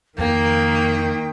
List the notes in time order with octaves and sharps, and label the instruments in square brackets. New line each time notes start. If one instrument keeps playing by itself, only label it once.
[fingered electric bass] F2 [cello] D#3 [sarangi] A#3 [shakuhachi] G5